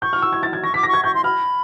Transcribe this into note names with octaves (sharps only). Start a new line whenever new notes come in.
C#6 G6
F6
E6
G#6
A6
G#6
C#6 A#6
D6 B6
C#6 A#6
G#6
C#6 G6
C6
B5 F6